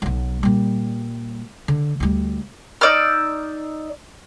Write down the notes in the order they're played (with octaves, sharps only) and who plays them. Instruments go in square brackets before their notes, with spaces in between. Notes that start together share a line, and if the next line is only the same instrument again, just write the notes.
[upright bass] B1 F#3
A#2 G3
D3
D2 G3
[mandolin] D#4 D5 E6 F6